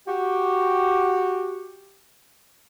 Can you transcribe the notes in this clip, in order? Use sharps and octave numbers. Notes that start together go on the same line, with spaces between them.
F#4 G4